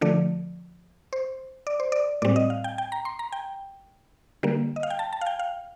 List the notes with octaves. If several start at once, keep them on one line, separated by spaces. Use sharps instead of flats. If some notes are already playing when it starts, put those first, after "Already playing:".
D3 F3 A3 D5
C5
D5
C5
D5
A2 G3 C4 D5
D#5
F5
G5
G5
A#5
C6
A#5
G5
D3 G3 A#3
D#5
F5
G5
A5
A5
F5
G5
F5